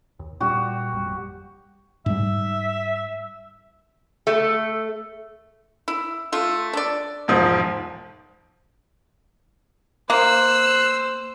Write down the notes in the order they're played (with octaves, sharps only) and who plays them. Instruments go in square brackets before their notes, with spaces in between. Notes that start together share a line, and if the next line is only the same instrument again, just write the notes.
[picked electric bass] D#2
[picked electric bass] A#2 G3 [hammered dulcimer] F#4 G4
[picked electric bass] G#1 F2 G3
[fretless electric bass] G#2 G3 [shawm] E5
[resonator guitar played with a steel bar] A3
[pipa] E4
A3 F4
D4 D5
[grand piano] E1 G#2 F3
[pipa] A#3 [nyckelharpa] C5 [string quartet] E6 [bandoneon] F#6